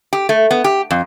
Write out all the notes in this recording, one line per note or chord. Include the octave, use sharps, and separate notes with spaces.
G4
A3
B3
G4
F2